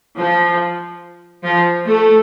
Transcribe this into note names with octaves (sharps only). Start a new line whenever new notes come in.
F3
F3
A3